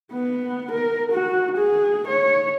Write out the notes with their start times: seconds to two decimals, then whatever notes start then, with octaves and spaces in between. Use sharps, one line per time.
0.12 B3
0.72 A#4
1.12 F#4
1.57 G#4
2.07 C#5